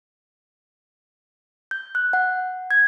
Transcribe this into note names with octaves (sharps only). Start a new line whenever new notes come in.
G6
F#6
F#5
G#6